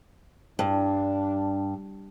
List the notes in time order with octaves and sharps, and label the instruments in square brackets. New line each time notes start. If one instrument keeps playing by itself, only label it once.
[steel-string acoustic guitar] G2 [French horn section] D4